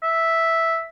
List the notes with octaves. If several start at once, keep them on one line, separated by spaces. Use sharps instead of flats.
E5